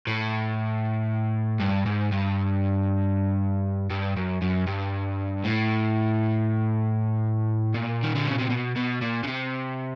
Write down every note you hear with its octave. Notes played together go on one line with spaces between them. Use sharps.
A2
G2
G#2
G2
G2
F#2
F#2
G2
A2
A#2
D#3
D3
C#3
C3
B2
B2
A#2
C#3
C3